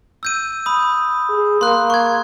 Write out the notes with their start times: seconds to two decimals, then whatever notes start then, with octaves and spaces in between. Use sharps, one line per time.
0.23 E6 G6 D#7
0.66 B5 D#6
1.29 G#4
1.61 A#3 C6 F#6
1.90 C#6 G#6